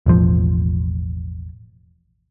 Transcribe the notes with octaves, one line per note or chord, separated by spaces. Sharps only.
E1 A1 F3